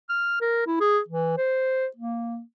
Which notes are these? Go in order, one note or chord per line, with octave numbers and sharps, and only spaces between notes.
F6
A#4
E4
G#4
E3
C5
A#3